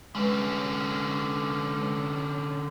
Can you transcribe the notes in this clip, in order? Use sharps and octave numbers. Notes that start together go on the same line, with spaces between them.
D3 G#3 C#4 B4